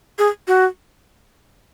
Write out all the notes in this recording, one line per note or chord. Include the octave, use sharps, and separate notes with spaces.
G#4
F#4